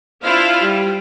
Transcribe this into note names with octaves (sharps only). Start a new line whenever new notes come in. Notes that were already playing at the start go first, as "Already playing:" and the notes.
D4 E4 F4 C5 F5
G3